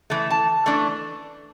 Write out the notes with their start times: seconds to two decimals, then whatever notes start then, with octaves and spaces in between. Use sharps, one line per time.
0.10 E3 A3
0.30 A5
0.66 E3 A3 D4